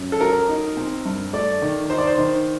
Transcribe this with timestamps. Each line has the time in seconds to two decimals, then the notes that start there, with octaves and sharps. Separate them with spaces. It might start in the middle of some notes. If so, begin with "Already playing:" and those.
Already playing: F#2
0.12 A4
0.20 F#3 A#4
0.48 D#4
0.77 C4
1.06 G2
1.33 A3 D5
1.62 D#3
1.90 D#4 C5
1.98 D5
2.07 C5
2.18 D#3